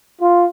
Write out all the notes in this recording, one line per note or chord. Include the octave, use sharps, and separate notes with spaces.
F4